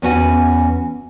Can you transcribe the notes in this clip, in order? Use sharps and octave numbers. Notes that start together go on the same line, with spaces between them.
E2 B3 C#4 F#4 E5 G#5